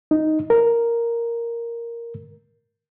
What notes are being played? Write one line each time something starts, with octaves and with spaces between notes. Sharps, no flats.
D#4
A#4